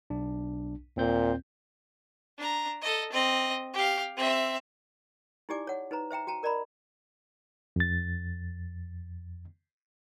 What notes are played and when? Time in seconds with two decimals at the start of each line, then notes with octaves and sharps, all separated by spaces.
0.10 B1 D4
0.96 D#2 A#2 C4 G6
2.39 D4 A#5
2.81 A4 D#5
3.13 C4 D#5
3.74 G4 F5
4.17 C4 E5
5.49 D#4 E4 G4 D5 G#5 D6
5.67 C#5 F#5
5.91 D#4 B4 C5 A#5
6.11 C5 E5 G5 A#5
6.27 F#4 G5 A5 A#5
6.43 A#4 D5 D#5 A#5 B5
7.76 F2 A6